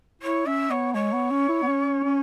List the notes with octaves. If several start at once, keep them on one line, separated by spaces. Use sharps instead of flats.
E4 C#5
C#4 E5
B3 C#5
G#3 C#5
B3
C#4
E4
B3
C#4
C#4